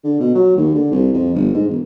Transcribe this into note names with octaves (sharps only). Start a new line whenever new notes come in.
D3
B2
F#3
D#2
D3
C2
F2
G1
G#2
E1